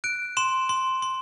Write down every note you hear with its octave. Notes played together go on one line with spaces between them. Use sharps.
F#6 D7
C6 E7
C6
C6